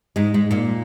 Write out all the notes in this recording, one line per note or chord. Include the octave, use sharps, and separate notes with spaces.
G#2 G#3
G#2 G#3
A#2 A#3